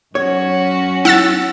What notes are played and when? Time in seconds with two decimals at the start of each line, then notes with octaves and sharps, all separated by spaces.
0.15 F#2 C#4 F#4 C#5
1.05 E4 F#5 E6 A6